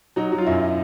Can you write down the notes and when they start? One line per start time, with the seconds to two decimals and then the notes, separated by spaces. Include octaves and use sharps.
0.16 F#3 D#4
0.32 F#3
0.38 F4
0.47 F#2 E4